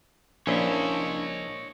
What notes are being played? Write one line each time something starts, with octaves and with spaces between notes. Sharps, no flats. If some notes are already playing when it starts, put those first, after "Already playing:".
A#1 C#4 D4 E4 F4 C#5 D#5